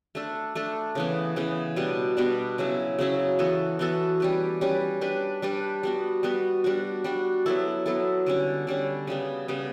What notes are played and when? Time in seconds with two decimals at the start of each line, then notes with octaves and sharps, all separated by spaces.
0.15 A3 D4 A4
0.55 A3 D4 A4
0.95 C#3 E3 B3
1.36 C#3 E3 B3
1.76 B2 G3 B3 D4
2.17 B2 G3 B3 D4
2.58 C#3 F#3 C#4 E4
2.99 C#3 F#3 C#4 E4
3.39 E3 B3 F#4 A4
3.79 E3 B3 F#4 A4
4.20 G3 C#4 G4 B4
4.61 G3 C#4 G4 B4
5.01 G3 D4 G4 B4
5.42 G3 D4 G4 B4
5.83 G3 B3 F#4
6.23 G3 B3 F#4
6.64 G3 D4 F#4
7.04 G3 D4 F#4
7.46 F#3 B3 E4 A4
7.86 F#3 B3 E4 A4
8.26 D3 G3 C#4
8.67 D3 G3 C#4
9.07 C#3 G3 B3
9.48 C#3 G3 B3